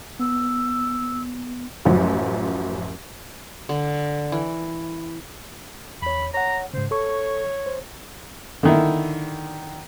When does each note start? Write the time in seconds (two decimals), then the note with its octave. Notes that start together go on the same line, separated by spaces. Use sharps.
0.20 B3 E6
1.85 A1 F#2 F3 F#3
3.69 D3
4.32 E3
6.02 E2 C#5 B5
6.34 C#5 F#5 A#5
6.74 G#2 C#3 C5
6.91 A4 C#5 C#6
7.66 C5
8.63 D3 D#3 E4